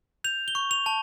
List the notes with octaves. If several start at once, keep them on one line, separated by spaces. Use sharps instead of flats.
G6 F7
G7
C#6
F7
A5